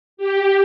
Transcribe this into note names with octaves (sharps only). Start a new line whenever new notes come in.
G4